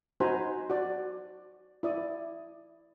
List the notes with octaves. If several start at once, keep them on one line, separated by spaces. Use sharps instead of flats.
D#4 F#4 C5 G#5 A#5 B5
F#4 D5
E4 D5 D#6